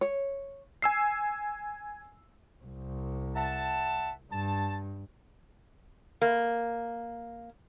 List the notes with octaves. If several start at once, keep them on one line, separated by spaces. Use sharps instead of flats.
C#5
G#5 E6 C7
C2
E5 F#5 A5
G2 A5
A#3